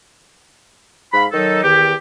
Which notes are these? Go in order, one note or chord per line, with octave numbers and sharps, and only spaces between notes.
G#2 F5 B5
D#3 F#3 D#4 A4
E2 D#3 G4